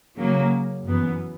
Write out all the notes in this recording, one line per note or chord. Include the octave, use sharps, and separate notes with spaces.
C#3 F#3 A#3
F#2 E3 B3